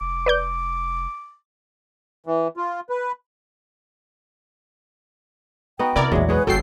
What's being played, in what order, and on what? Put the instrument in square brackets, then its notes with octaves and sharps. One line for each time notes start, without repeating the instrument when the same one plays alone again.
[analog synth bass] F1 [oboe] D6
[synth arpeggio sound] B4 D5 G6
[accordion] E3
F4
B4
[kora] B3 D#4 F#4 [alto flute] G5
[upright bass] C3 [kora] E4 [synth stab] A#4 D5
[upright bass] A#1 E2 [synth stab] A#2 G#3 [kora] F#3 D4 [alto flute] E5
[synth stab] G#3 [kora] B3 G#4 C#5 [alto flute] B4
[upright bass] G1 F3 [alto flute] F#4 [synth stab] A4 G5 C7